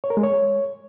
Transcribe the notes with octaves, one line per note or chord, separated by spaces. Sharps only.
C#5
A#4
G#3
C#5